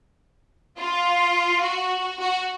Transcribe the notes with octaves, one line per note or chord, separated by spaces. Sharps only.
F4
F#4
F#4